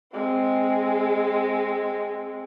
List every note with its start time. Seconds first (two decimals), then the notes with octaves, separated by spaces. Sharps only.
0.14 G#3 C4